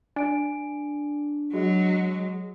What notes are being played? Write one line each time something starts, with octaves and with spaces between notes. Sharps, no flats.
D4 G#5 D7
F#3 G#3 F#4 D#5